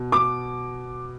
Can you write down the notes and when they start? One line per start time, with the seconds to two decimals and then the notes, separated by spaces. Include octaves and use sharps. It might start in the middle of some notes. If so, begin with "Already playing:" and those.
Already playing: B2
0.12 D6